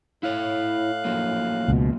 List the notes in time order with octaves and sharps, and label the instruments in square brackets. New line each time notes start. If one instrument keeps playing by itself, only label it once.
[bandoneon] A2 F5 F#6 [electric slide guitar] E4 C#5
[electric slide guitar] F3 F#3 A#3
[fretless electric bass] C#2 B2